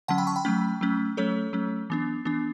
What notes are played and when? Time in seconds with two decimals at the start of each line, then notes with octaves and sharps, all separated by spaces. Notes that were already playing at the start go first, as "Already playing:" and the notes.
0.08 D3 F#3 C#4 F#5 A5
0.18 G5 B5
0.27 A5 C#6
0.36 G5 B5
0.45 F#3 A3 C#4
0.81 F#3 A3 C#4
1.17 F#3 A3 C#4 A4 C#5
1.53 F#3 A3 C#4
1.90 E3 B3 D4
2.25 E3 B3 D4